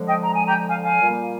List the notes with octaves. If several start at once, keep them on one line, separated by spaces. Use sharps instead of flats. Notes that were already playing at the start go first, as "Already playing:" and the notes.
Already playing: D3 F3 G#3
D#5 G5
A#5
G#5
G5 A#5
F5 G#5
F5 G#5
A#2 G3 A#3